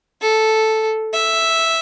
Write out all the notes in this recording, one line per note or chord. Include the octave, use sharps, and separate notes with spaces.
A4
E5